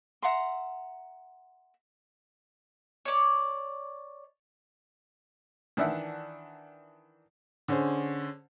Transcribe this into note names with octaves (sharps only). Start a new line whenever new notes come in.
E5 F#5 A#5 C6
C#5 D5
D#3 E3 D4 E5 F#5
D3 C#4 G#4 C5